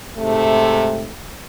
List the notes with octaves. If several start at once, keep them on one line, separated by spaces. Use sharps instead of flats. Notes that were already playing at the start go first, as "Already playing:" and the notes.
G#2 C3 A3